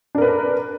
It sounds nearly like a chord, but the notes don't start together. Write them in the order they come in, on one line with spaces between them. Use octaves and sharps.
D4 A#4 B4